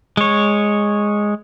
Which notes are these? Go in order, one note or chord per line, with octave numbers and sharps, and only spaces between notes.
G#3 C#5